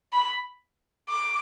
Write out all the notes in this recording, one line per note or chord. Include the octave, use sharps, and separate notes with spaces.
B5
D6